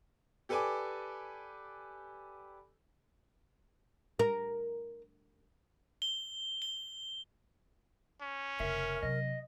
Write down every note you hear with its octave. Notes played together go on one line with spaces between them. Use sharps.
G4 A4 B4 D5 G#5 D6
A#4
G7
G7
C#4
F1 C#3 A#4 E5
C3 F#3 D#5